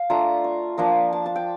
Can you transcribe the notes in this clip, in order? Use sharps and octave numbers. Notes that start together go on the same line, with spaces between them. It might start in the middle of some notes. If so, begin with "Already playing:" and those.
Already playing: F5
A3 D4 F4 A#5
C#6
F3 A#3 D4 A#5
A5
A5
G5